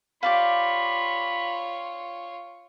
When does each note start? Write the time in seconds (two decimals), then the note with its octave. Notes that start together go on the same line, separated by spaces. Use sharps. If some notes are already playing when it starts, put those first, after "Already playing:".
0.23 F4 G4 C#5 D5 F5 B5